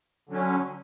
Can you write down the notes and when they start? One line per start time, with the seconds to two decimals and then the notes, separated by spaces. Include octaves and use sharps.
0.29 D3 F#3 C#4